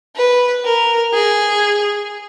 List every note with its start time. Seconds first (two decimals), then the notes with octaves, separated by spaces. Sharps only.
0.16 B4
0.65 A#4
1.13 G#4